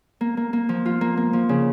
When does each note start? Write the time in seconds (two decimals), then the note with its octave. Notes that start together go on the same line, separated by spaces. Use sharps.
0.21 A#3
0.37 A#3
0.53 A#3
0.69 F3
0.85 F4
1.01 A#3
1.17 A#3
1.33 F3
1.49 C#3